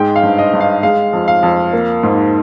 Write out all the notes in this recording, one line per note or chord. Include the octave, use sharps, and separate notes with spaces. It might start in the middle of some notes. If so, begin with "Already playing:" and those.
Already playing: G#2 G#3 G5
F5
G2
D#5
G2
F5
G#3 F5
F2
F5
F2
A#3
G#2